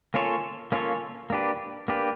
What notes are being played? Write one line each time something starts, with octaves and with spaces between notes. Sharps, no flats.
A#3 C#4 F4 A4 C#5
A#3 C#4 F4 A4 C#5
A#3 D4 G4 B4
A#3 D4 G4 B4